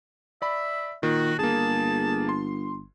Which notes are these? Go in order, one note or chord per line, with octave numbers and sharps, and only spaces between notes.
D5 E5 B5
A#2 D#3 F#4
G1 A#3 G#4 A5
C6